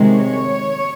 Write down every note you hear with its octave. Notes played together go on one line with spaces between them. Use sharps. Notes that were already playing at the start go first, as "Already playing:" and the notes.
Already playing: C3 D#3 G#3
C#5